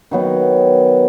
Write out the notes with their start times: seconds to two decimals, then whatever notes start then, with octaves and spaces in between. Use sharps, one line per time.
0.11 D#3 F#3 B3